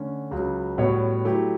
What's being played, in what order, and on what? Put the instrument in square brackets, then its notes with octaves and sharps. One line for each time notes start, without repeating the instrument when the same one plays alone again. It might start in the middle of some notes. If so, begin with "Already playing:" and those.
Already playing: [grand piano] D3 A3 C#4
C#2 C#3 F#3
A2 G3 B3 F#4 C#5
F#3 A3 E4 G4